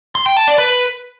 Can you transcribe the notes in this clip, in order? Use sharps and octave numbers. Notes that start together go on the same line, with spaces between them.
C6
G5
A5
D5
B4